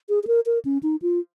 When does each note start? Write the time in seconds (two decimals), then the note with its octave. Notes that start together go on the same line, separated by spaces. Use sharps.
0.09 G#4
0.23 G#4
0.27 A#4
0.46 A#4
0.65 C#4
0.83 D#4
1.02 F4